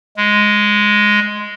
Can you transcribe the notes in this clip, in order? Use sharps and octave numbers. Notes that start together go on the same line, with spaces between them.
G#3